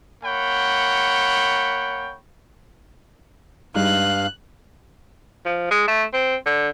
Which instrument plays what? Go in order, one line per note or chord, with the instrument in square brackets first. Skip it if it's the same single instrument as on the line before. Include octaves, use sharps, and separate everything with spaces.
[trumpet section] A#3 C#5 F#5 G5 B5
[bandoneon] G2 F5 [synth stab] G3 G#3 D#4 [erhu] F#6
[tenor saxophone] F3
G#3
A3
C4
D3